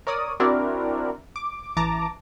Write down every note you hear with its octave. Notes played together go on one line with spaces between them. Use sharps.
A#4 C#5 D5 D#6
C4 D4 E4 F#4 A#4 D5
D6
A1 E3 A5 A#5 D6